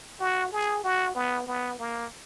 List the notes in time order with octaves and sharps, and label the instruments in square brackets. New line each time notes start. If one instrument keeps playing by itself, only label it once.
[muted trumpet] F#4
G#4
F#4
B3
B3
A#3